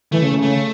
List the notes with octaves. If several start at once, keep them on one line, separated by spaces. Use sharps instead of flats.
E3 A3
C#3
C#3
A3